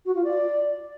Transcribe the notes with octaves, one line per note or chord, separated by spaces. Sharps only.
F#4
F4
D5